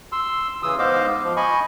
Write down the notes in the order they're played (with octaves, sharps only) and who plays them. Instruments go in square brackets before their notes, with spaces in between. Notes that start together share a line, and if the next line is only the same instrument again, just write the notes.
[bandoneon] C6 E6
C#3 E3 D#6 E6
G#2 B3 C5 D#5 F5 D6
F3
D#5 G#5 B5 C#6